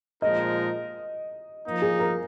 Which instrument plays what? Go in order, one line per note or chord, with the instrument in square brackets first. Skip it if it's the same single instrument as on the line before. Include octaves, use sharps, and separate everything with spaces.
[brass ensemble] A#2 F3 G#3 D#4 A#4 [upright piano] D#5
[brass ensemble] F3 A#3 D#4
[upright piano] G#4
A#4